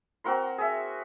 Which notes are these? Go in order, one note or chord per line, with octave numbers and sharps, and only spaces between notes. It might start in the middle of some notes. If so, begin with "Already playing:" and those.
C4 F#4 A#4 C6
G#4 E5